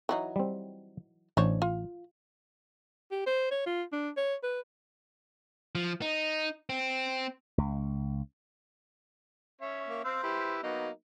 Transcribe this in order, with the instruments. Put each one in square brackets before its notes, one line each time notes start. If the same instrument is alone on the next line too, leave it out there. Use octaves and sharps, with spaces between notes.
[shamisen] E3 F#3 D#4
[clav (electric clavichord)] G3 C4
[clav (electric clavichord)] A1 [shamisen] D4 C5 C#5
[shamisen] F4
[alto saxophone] G4
C5
C#5
F4
D4
C#5
B4
[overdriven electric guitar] F3
D#4
C4
[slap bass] C#2
[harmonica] C#4 C#5 E5
[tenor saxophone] A#3
[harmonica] C4 F5 E6 [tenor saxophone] C5
[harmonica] E4 G4 B4
[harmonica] F#3 A#3 D#4 [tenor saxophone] B3